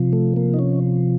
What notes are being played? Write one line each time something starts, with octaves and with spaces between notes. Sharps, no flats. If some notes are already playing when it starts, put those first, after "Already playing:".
Already playing: C3 F3
A3
A#3
D#4
C#4